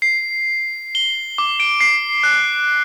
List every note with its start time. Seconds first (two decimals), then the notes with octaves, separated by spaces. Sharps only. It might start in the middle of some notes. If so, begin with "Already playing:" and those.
0.02 C7
0.95 G7
1.38 D6
1.60 D7
1.80 C7
2.23 F#6